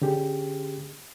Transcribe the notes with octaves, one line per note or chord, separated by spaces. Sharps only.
D3 C#4 G4 G#4